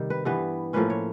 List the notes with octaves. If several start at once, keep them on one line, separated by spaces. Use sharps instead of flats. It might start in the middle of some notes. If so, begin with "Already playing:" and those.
Already playing: C3 D#3 G3
B4
G2 E3 G3 B3 B4
A2 F3 A#3 C#4 B4
C#5